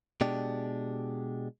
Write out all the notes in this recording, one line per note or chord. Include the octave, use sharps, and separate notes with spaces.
B2 G#3 D4 G4